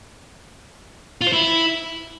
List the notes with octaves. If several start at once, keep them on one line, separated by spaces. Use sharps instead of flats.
F4
C5
E4